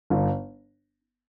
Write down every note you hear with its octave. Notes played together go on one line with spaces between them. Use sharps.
G1